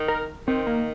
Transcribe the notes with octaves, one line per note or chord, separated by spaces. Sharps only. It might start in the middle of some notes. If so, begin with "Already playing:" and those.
Already playing: D#3
A#4
D#3 C4
A#3